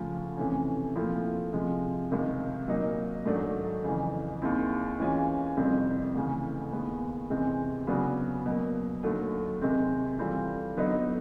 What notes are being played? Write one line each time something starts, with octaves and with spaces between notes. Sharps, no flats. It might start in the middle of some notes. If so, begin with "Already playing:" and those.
Already playing: D2 C#3 F3 A3
C3 E3 A3 C#4
A#2 F3 A3 C4 E4
C3 F3 G#3
C#2 C3 D#3
A#2 F#3 A#3 D#4
G#2 D#3 F#3 A3 D4
F2 C#3 E3
D#2 D#3 G#3 C4 E4
E3 G#3 C#4 F4 G#4
F2 C3 D#3 G3 C4
D2 C#3 E3
D#2 D#3 G#3 B3
E2 C3 E3 G#3 C4
C#3 F#3 B3 D4 F#4
B2 F#3 A#3
D#2 D3 F#3 A3
C3 D#3 G#3 C4
E3 G3 C4 F4 A4
D3 F#3 B3 D#4